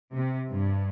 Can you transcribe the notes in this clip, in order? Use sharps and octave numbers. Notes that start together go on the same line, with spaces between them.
C3
G2